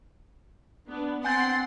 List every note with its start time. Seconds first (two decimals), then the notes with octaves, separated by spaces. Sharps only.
0.88 B3 D4
1.24 C4 D4 F#5 G#5 C6 G6